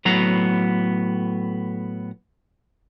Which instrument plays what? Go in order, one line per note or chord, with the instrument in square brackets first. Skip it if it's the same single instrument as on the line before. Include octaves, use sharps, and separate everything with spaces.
[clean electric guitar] A2 F#3 B3 A#5